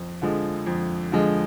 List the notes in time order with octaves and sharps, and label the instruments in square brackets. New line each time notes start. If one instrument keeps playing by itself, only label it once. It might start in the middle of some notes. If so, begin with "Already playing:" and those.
Already playing: [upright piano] F2
D3 F3 G#3
F2
D3 F3 G#3